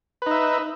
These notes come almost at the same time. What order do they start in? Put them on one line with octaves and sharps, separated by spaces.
B4 D#4 E5